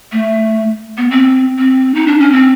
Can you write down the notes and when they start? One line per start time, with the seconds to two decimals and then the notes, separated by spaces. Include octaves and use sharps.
0.12 A3
0.97 B3
1.10 C4
1.58 C4
1.95 D#4
2.07 D4
2.20 C#4
2.32 C4